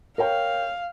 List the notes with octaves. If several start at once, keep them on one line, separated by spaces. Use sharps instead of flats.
A#4 C#5 F5 G5